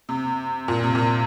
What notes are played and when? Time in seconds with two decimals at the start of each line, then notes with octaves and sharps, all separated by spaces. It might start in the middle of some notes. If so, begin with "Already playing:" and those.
0.09 C3
0.68 A#2
0.84 C3
0.95 A#2